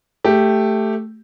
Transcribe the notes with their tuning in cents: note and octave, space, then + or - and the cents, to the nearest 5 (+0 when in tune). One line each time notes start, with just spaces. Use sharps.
A3 +0 G4 +0